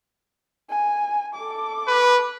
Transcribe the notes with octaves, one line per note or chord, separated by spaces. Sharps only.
G#5
A4 D6
B4